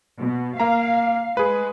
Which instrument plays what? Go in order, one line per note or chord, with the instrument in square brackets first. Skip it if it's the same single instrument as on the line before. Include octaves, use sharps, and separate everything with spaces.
[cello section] B2
[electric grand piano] A#3 A#5 [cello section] F5
[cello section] G#3 [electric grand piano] G#4 B4